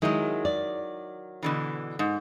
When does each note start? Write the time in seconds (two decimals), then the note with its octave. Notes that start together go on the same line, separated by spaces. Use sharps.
0.02 D#3 F#3 G#3 E4 D#5
0.45 D5
1.43 B2 D3 E3
1.99 G#2